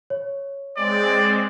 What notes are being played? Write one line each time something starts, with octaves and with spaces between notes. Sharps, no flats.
C#5
G#3 C4 D5